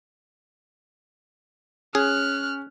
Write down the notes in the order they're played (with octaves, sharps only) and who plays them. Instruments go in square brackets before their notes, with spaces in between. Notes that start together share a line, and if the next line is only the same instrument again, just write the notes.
[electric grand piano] C#4 [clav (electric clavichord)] G#4 [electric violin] F6 F#6